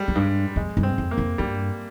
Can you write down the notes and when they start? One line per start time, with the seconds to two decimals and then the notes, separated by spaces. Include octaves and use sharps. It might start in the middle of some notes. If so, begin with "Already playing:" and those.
Already playing: G3 G#3
0.08 F2
0.15 G2
0.56 F2 G#3
0.77 G2
0.83 C4
0.98 F2
1.11 A#3
1.18 F2
1.38 G2 G3